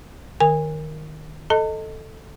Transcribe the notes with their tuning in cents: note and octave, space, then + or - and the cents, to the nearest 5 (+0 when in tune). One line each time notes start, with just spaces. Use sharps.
D#3 -20 A#4 +0 G#5 -25
A4 +0 D#5 +5 A5 +35